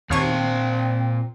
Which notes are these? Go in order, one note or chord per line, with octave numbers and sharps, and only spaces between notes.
D#2 A#2 C4 C#5 F5 A5 C#6